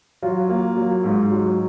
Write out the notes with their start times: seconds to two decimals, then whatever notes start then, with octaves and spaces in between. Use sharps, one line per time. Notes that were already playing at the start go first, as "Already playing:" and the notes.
0.22 F#3 F4
0.49 A#3
0.76 F#3
1.04 G#2
1.30 F#3